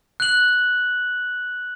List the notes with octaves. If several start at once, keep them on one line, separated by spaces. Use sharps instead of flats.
F#6 F#7